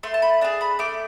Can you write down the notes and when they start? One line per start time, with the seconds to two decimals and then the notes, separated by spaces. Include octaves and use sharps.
0.03 A3 C6
0.14 A5
0.22 B5
0.41 D4 G#4 A5
0.61 B5
0.79 A3 D6